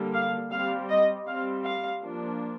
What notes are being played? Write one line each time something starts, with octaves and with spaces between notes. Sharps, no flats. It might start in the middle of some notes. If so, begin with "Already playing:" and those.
Already playing: D3 G3 A#3
F5
G3 C4 F5
D#5
G3 C4 F5
F5
F3 A#3 D4